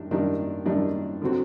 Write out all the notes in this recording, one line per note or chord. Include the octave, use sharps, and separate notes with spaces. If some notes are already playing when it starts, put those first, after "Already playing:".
Already playing: F#2 D#3 G3 D4
F#2 D#3 G3 D4
F#2 D#3 G3 D4
D3 F#3 C4 F#4